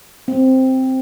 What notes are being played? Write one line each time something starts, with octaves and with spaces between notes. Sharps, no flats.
C4